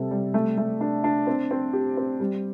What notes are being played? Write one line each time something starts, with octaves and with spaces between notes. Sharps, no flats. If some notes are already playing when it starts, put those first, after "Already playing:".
Already playing: C3 G3 A4
G3
A3
A3
D4
D4
C4
C4
G4
C4
G3